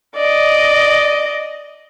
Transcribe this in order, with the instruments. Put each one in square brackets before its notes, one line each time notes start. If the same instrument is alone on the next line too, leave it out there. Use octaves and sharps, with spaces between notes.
[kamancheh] D5 D#5